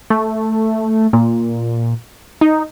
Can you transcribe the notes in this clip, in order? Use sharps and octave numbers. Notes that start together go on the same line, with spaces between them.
A3
A#2
D#4